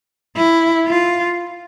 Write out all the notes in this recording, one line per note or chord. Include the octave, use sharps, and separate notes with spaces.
E4
F4